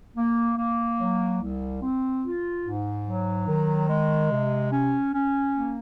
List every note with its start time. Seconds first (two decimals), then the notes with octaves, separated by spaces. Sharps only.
0.17 A#3
0.58 A#3
1.00 F#3
1.42 C2
1.82 C4
2.24 F4
2.66 G#2
3.06 F#3
3.48 D#3
3.89 G#3
4.31 C3
4.72 C#4
5.14 C#4
5.55 A#3